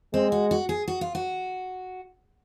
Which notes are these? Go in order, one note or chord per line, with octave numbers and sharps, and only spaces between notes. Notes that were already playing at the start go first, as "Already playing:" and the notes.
G#3 C4
F#4
F#4
G#4
F#4
F4
F#4